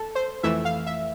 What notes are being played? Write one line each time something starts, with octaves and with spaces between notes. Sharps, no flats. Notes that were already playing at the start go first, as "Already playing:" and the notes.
Already playing: A4
C5
F2 E3 A3 E5
F5
E5